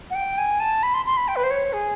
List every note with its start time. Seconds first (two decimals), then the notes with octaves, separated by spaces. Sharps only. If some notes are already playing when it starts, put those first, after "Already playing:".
0.11 F#5
0.15 G5
0.38 G#5
0.60 A5
0.83 B5
0.94 C6
1.06 C6
1.17 B5
1.28 G5
1.36 B4
1.44 C5
1.51 C#5
1.73 G#4